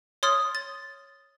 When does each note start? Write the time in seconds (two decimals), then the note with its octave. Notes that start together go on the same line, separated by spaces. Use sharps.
0.23 C#5 C6 D#6 F6 A6
0.55 A6